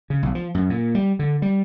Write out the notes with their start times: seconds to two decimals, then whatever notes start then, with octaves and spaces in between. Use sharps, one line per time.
0.10 C#3
0.23 B1
0.35 F3
0.55 F#2
0.70 A#2
0.95 G3
1.19 D3
1.42 G3